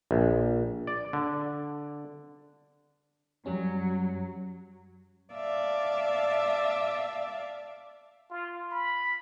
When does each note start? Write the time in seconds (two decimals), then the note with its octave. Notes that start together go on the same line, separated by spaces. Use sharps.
0.11 A#1
0.87 D5
1.13 D3
3.46 F#2 F#3 G3 C#4
5.33 D5 E5 F5 A5
8.30 F4
8.71 B5